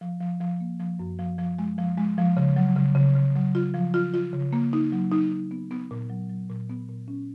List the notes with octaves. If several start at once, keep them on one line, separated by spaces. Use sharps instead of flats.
F3
F3
F3
A#3
F3
F#2
F3
F3
G#3
F3
G#3
F3
C#3
F#3
C#3
C#3
C#3
F#3
F4
F3
F4
F4
C#3
A#3
D#4
F#3
D#4
D#4
B3
B3
A#2
F#3
F#3
A#2
B3
A#2
C#4